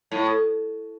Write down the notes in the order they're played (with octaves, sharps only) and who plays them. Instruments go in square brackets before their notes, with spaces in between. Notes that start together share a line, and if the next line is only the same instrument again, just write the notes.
[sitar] A2